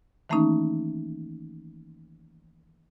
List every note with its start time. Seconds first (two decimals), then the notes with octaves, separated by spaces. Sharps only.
0.29 D#3 E3 A3 A#3 C#4 D#4